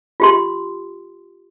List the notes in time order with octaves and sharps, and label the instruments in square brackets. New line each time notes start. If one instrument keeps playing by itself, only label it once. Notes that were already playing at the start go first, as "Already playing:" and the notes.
[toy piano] F4 G4 C6